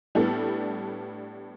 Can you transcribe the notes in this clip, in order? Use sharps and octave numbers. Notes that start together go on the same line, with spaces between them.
A2 G3 B3 D4 A4